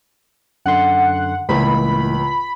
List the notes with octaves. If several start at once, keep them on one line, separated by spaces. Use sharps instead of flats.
F#2 D3 F#5 C6
C#2 A2 E3 A#3 B5